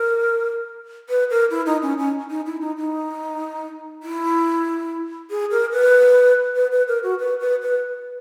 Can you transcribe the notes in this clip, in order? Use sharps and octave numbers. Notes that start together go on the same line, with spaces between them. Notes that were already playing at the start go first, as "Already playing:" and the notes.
Already playing: A#4
B4
A#4
E4
D#4
C#4
C#4
D#4
E4
D#4
D#4
E4
G#4
A#4
B4
B4
B4
A#4
F#4
B4
B4
B4